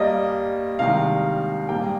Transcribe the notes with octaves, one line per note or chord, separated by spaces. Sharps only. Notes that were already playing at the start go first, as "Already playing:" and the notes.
Already playing: G2 G3 A#3 D#5
C2 C3 D#3 G#3 F5
A#1 G#2 G3 A#3 G5